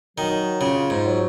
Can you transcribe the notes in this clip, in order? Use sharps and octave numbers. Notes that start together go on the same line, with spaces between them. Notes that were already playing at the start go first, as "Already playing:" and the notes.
D#3 F#3
C#3 F4
G#2
F#3